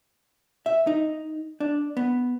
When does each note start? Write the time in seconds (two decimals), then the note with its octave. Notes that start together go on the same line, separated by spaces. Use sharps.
0.66 E5
0.87 D#4
1.60 D4
1.97 B3